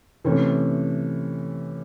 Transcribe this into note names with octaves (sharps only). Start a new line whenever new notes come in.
C3 E3 A3 C#4